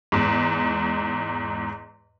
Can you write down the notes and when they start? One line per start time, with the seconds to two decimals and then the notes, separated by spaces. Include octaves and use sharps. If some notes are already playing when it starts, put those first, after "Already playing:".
0.12 E2 G#2